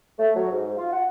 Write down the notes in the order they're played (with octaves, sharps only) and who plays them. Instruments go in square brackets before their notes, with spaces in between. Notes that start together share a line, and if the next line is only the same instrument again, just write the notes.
[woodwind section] A3
F#3
G#2
F4
F#5